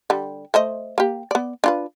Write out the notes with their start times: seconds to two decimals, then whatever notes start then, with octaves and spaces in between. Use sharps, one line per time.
0.10 D3 G3
0.54 A3 C5 D#5
0.98 A#3 G4
1.31 B3 D5
1.64 D4 F4 B4